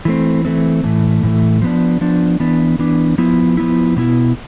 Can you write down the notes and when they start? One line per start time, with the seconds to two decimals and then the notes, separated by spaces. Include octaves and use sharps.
0.05 E3 A3 C4
0.45 E3 A3 C4
0.84 A2 E3 A3
1.23 A2 E3 A3
1.62 F3 B3 D4
2.01 F3 B3 D4
2.40 E3 B3 D4
2.79 E3 B3 D4
3.18 F3 B3 E4
3.57 F3 B3 E4
3.96 B2 B3 E4